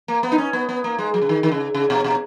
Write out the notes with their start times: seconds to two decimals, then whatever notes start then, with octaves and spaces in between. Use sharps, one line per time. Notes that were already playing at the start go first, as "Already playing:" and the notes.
0.08 A#3
0.23 B3
0.32 D#4
0.38 C#4
0.53 B3
0.69 B3
0.84 A#3
0.99 G#3
1.14 F#3
1.22 C#3
1.29 D#3
1.43 D#3
1.52 C#3
1.75 C#3
1.90 B2
2.04 B2